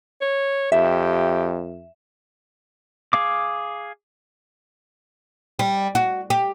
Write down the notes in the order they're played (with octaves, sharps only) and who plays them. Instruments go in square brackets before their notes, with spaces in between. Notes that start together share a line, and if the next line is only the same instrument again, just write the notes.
[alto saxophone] C#5
[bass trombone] F2 [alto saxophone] G4 [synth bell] E5
[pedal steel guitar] G#4 F5 D6
[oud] G3
F#4
G4